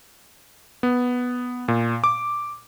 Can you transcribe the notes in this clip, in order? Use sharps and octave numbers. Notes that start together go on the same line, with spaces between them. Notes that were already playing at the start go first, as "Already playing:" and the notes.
B3
A#2
D6